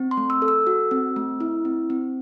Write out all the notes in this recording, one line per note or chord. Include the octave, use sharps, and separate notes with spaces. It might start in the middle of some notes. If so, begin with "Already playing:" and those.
Already playing: C4
C6
A3
E6
A4
E6
F#4
C4
A3
E4
C4
C4